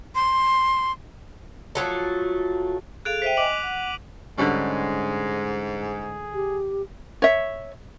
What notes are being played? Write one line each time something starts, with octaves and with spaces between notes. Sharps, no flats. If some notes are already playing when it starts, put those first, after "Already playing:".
C6
F3 F#3 A3
G#4 A4 F5 F#6 D7 F7
C5 E5 G5 B6 D#7
D#5 G#5 D6 D7 F#7
F#5
G#2 D3 G3 G#3 C#4
G#4
G4
C#5 E5